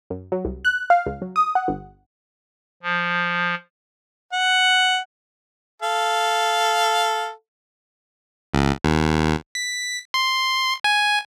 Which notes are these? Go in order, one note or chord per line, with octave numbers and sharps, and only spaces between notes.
F#2
F#3
C2
F#6
F5
C#2
F#3
D#6
F#5
G1
F3
F#5
A4 F5
C#2
D#2
B6
C6
G#5